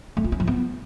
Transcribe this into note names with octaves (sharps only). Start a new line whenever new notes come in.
A3
F4
C#4
F3
B3